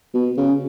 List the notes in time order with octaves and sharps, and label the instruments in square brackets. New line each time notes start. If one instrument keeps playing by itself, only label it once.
[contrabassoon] B2
C#3